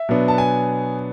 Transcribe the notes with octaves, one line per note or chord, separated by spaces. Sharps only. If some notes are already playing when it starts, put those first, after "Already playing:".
Already playing: E5
B2 F#3 B3 D4
A5
G#5